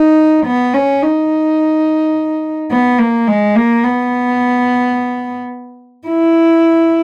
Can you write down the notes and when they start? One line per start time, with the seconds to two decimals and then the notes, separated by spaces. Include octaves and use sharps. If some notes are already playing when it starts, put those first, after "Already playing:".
Already playing: D#4
0.46 B3
0.74 C#4
1.02 D#4
2.71 B3
2.98 A#3
3.27 G#3
3.55 A#3
3.84 B3
6.08 E4